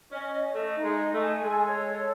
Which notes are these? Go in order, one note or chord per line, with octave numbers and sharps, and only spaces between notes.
C#4 D#5
D#5
A3 D#5
D#4
G#3
D#5
A3
G#5
G#3 A4
C#5
A4